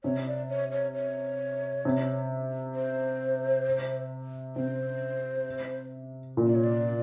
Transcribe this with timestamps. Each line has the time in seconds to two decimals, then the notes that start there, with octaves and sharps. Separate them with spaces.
0.04 C3 C#5
0.27 D5
0.49 C#5
0.72 C#5
0.94 C#5
1.85 C3
2.75 C5
4.56 C3 C5
6.37 A#2
6.46 D5
6.55 C#5
6.64 D5